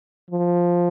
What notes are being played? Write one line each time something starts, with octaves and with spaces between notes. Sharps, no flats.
F3